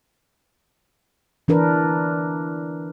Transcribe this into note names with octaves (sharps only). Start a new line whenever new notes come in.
E3 D4 A#4 B4